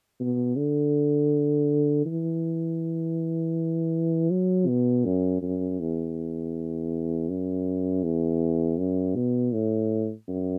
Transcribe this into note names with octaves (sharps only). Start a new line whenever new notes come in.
B2
D3
E3
F#3
B2
F#2
F#2
E2
F#2
E2
F#2
B2
A2
F#2